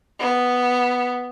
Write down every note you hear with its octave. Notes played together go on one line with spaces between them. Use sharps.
B3